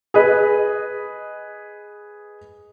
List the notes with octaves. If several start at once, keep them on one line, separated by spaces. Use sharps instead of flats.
G#4 B4 D#5